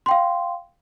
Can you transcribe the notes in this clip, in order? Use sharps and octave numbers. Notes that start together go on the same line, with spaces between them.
F5 G5 C6